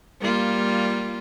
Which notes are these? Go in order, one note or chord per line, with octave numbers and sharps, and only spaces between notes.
G3 A#3 F4